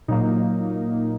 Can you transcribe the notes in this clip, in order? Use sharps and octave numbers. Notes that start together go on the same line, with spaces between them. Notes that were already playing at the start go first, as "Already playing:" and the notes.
A#2 F#3 A#3 D#4